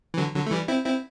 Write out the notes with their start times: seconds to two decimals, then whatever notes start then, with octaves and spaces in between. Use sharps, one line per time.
0.14 E3
0.17 D3 F#3
0.35 D3 F#3
0.46 A3
0.51 E3 G3
0.68 C4 E4
0.85 C4 E4